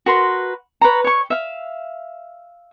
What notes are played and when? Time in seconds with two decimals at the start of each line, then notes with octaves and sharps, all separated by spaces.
0.06 F#4 A#4 B4 C6
0.81 B4 C#5 A#5
1.04 C#5 C#6
1.30 E5 F5